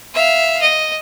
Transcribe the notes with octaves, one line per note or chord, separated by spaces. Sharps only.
E5 F5
D#5